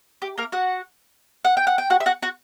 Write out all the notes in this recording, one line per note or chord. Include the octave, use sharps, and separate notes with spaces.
G4
A#3 A#4
F#4 F#5
F#5
G5
F#5
G5
F#4 F#5
E5
F#4 F#5
F#4 F#5